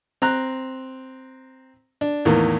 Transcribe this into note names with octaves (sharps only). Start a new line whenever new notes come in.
C4 A#5 F#6
D4
E2 A2 D#3 E3 A#3